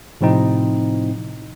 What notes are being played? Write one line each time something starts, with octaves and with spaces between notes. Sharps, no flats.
A2 C3 F3 C4 D#4 E4